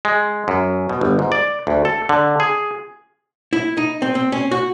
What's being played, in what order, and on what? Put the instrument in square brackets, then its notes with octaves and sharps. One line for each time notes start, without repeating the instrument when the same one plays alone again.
[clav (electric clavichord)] G#3
F#2
B2
G1
G#2
D5
D2
A4
D3
G#4
[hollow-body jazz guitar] E4
D#4
C4
C4
C#4
F#4